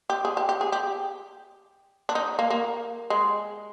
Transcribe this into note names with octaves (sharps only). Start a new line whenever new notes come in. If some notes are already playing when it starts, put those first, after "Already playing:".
G4
G#4
G4
G4
G#4
G4
D4
D#4
A#3
A#3
G#3